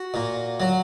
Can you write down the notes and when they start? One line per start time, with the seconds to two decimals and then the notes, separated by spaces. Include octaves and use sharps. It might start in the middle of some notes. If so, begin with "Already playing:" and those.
Already playing: F#4
0.14 A#2
0.60 F#3